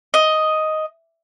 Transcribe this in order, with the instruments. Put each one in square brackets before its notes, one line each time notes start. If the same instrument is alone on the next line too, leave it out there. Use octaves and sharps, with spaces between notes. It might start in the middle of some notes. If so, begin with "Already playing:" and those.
[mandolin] D#5